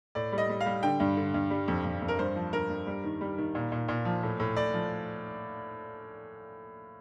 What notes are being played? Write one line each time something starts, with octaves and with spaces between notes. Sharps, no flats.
A2 D5
G3
D#5
G3
F5
G3
D3 G5
G2
D3
G2
G3
F2
F2
F2
A#4
G2 C5
F3
G2 A#4
G2
G3
D#3
G3
D#3
A#2
A#2
A#2
F3
A2
A2
A2 D5
F3